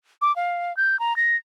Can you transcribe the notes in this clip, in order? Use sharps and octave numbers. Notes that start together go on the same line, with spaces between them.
D6
F5
G6
A#5
A#6